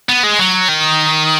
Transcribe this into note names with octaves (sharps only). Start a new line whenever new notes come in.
B3
G#3
F#3
D#3